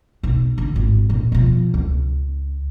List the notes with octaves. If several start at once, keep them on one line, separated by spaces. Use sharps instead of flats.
B1
D3
G#1
A#1
B2 F3
C#2